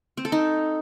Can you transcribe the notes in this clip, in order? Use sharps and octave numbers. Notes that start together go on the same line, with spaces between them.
C4
A4
D#4